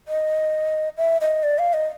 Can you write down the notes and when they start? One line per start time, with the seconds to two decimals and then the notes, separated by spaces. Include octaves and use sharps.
0.08 D#5
0.97 E5
1.21 D#5
1.43 D5
1.59 F5
1.73 D#5